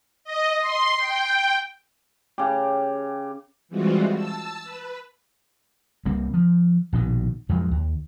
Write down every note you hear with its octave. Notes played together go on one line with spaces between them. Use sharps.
D#5
C6
G5
C#3 G4
E3 G3 G#3 C4 F4 F#4
A5 E6
B4
C2 G3 A#3 C4
F3
A#1 B2 D#3
F2 F3 F#3 G#3
D#2